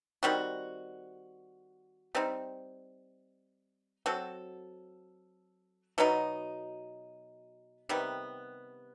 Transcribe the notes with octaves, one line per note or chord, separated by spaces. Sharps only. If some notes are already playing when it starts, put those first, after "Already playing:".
D#3 G3 C4 F#4
G3 C4 D#4
F#3 C4 F#4 A4
B2 F#3 B3 D#4
C3 D#3 G3 B3